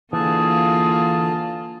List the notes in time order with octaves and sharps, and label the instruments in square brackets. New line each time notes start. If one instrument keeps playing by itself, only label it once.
[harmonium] D3 A5 [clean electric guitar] E3 [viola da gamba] A#3 F4 [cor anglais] G#4